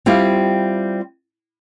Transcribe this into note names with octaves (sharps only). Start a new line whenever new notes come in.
G3 C4 E4 F4 G4